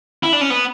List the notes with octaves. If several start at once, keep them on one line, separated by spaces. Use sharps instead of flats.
E4
D4
C#4
B3